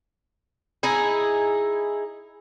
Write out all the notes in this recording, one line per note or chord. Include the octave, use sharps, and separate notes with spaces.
D#4 E4 G#4